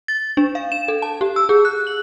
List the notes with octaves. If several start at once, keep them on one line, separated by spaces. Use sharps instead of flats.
A6
D4
F5
E7
A4
A5
G4
E6
G#4
F#6
F#7